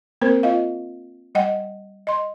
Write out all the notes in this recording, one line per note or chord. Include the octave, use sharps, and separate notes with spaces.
A#3 C4 A#4 C5
F4 D#5 F5
G3 D#5 F#5 G5
D#5 C6